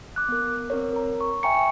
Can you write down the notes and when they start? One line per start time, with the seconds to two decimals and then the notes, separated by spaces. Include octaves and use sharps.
0.16 D6 F#6
0.29 B3 A#4
0.70 C4 A#4 C#5
0.93 A#4 A#5
1.21 C#6
1.43 E5 G5 G#5 A#5 C#6 C#7